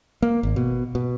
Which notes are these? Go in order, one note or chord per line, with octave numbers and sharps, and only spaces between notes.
A#3
G#1
B2
B2